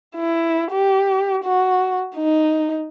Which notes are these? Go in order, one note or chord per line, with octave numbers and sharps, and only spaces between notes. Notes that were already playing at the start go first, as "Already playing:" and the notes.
E4
G4
F#4
D#4